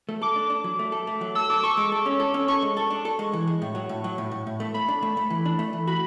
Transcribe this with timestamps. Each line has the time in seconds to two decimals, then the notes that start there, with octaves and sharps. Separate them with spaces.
0.09 A3
0.22 A4 D6
0.36 D4
0.50 D4
0.64 F#3
0.79 A3
0.92 A4
1.07 A3
1.21 F#3
1.35 A4 E6
1.49 A4 D6
1.63 A4 C#6
1.77 G#3 D6
1.92 A4
2.06 C#4
2.20 A4
2.34 C#4
2.48 A4 C#6
2.62 G#3
2.77 A4
2.90 D4
3.05 A4
3.19 G#3
3.33 E3
3.47 G#3
3.62 A2
3.75 F#3
3.89 A2
4.04 F#3
4.18 A2
4.31 A2
4.47 A2
4.60 A3
4.74 A3 B5
4.88 D4
5.03 A3
5.17 A3
5.30 E3
5.46 D4
5.59 A3
5.73 E3
5.87 F#4 B5